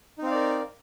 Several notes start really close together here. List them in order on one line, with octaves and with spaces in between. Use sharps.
D#4 C4 F5 D5 A#4